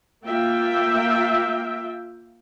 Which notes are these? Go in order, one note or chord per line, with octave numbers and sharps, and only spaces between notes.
A#3 F4 E5 G5